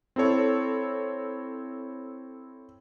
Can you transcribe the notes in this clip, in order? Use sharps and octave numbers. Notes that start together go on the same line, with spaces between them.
C4 E4 A4 C#5